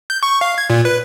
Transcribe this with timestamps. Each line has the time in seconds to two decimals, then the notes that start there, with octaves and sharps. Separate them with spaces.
0.10 G6
0.23 C#6
0.41 F5
0.58 G#6
0.70 A#2
0.85 B4